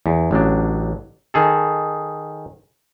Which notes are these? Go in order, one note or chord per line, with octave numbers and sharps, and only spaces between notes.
E2
A1 F#3 D4
D#3 G#4 A4